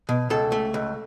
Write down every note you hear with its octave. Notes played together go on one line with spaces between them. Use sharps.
B2
C#2 A4
A3
C#2